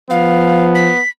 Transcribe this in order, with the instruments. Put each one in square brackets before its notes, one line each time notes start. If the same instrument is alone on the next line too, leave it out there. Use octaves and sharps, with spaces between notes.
[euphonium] F3 [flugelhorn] B3 [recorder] F5
[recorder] B6